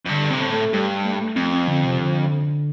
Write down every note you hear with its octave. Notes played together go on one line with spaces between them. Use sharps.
F2
G2 D3
C3 C4
A2
A3
G2 G3
A3
A3
F2 C4
C4
D3
C3
D3